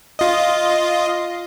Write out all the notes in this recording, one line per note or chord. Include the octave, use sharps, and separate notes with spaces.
F4 D#5